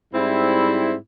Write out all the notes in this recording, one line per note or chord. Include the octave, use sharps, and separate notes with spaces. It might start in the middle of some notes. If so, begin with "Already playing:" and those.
G#2 G3 C4 E4